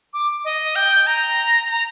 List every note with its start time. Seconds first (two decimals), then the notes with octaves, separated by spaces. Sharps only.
0.14 D6
0.45 D#5
0.76 G5
1.07 A#5
1.69 A#5